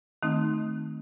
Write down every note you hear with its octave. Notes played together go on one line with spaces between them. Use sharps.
D#3 A3 C4 D#4